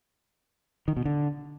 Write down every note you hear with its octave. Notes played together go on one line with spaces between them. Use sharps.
D#3
B2
D3